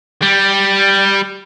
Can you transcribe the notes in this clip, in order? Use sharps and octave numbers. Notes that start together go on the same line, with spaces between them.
G3